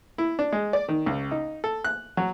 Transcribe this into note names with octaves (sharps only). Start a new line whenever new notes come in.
E4
D4
G#3
D5
D#3
C#2
D#4
A4
F#6
F#3